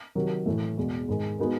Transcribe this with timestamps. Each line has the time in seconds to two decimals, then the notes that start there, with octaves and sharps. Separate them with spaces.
0.15 C3 D#3 F#3
0.46 A2 E3 A3
0.77 E2 B2 G#3
1.08 G#2 D#3 G#3
1.39 G#3 B3 D#4 F#4 A#4